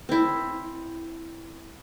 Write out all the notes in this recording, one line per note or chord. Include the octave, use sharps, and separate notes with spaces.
C4 E4